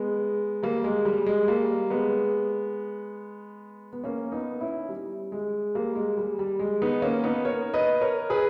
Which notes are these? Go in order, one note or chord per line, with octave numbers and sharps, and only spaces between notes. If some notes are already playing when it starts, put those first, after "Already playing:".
Already playing: G#3 B3
G3 A#3
G#3
G3
G#3
G3 A#3
G#3 B3
B3
A#3 C#4
B3 D#4
C#4 E4
G3
G#3
G3 A#3
G#3
G3
G3
G#3
B3 D#4
A#3 C#4
B3 D#4
A#4 C#5
B4 D#5
A#4 C#5
G#4 B4